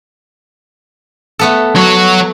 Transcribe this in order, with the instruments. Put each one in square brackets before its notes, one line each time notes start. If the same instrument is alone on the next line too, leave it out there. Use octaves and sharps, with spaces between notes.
[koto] A3 B3 A4
[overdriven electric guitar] F#3 F#4